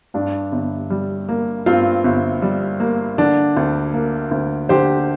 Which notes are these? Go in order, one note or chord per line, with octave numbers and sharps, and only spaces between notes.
G2 D4
G1
G3
A#3
G2 C4 F4
G1
G3
A#3
D3 D4
D2
A#3
D2
D3 G4 C5